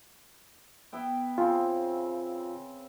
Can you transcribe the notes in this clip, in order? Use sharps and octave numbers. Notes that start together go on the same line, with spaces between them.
B3 E4 G5
C#3 C4 F4